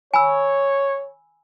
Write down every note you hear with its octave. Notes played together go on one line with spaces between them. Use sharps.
C#5 G#5 B5 E6